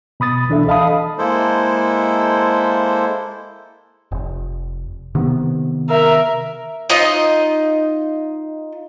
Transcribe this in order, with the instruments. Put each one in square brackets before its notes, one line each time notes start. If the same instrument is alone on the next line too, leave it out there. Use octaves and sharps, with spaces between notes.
[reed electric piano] B2 B5 D#6 A6
C#2 E3 D4 A4 E5
A4 D#5 F5 A5 B5 D#6
[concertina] G#3 A#3 E4 A4 C5
[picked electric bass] F1
C3 D#3 B3
[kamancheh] A#4 E5
[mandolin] D#4 F4 D#5